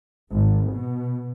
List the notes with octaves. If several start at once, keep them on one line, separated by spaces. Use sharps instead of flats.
G#1
B2